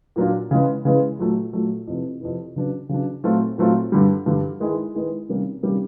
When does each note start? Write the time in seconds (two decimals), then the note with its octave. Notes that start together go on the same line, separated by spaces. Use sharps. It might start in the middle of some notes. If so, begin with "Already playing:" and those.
0.16 A#2 F#3 A#3 D4 F4
0.51 C#3 E3 G#3 B3
0.85 C#3 E3 G#3 B3
1.19 A#2 F#3 A3
1.53 A#2 F#3 A3
1.87 F2 C3 E3
2.21 F2 C3 E3
2.56 C#3 F#3 B3 D4
2.89 C#3 F#3 B3 D4
3.24 A#2 F#3 A3 C4 F4
3.58 A#2 F#3 A3 C4 F4
3.92 G2 D3 G3
4.26 G2 D3 G3
4.60 D#3 G#3 B3 E4 G#4
4.95 D#3 G#3 B3 E4 G#4
5.29 C3 D#3 G3 A#3 C#4
5.63 C3 D#3 G3 A#3 C#4